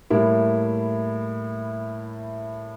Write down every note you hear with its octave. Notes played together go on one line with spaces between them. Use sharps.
A2 G3 A#3 E4